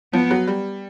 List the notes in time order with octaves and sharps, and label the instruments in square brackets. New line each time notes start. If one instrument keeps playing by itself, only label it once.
[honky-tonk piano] F3 [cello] B3
[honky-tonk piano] F#3
G3